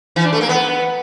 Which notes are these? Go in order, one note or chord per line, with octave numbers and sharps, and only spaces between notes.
E3
D4
A3
A#3
B3